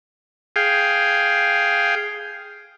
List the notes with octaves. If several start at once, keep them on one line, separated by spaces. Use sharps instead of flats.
G#4 F5 G5